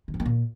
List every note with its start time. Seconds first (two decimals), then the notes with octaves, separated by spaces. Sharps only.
0.08 D#3
0.14 F3
0.20 A#3
0.26 A#2